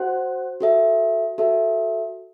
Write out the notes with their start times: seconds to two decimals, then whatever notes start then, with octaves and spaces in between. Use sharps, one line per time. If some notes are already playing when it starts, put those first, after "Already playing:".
Already playing: F#4 C5 F#5
0.60 F#4 A4 E5
1.38 F#4 A4 E5